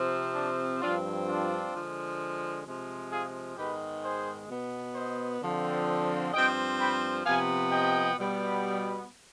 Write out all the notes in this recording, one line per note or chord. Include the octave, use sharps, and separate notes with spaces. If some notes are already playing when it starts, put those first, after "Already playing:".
Already playing: C3 F3 C4
D4
G2 F3 C4 D4 F4
D4 F4
D3 F3 G#3
C3 F3 G#3
F4 G#4
G#2 D#3 G#3 B3 G4 B4
G#4 C5
B2 B3
C5 D#5
D3 F3 C4
G2 F3 C4 D#5 G5
G5 B5
C3 F3 B3 F5 G#5
D#5 G5
B2 G3 B3